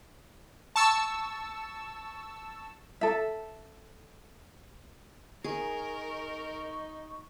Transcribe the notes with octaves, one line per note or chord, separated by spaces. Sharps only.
A5 C#6 E6
A4 E5
D#4 G#4 A#4 C#6